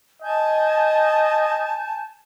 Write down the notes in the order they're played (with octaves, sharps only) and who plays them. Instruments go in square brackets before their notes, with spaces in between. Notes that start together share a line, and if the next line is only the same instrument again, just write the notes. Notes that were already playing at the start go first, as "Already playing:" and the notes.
[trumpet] D#5 [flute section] G#5 A5 G6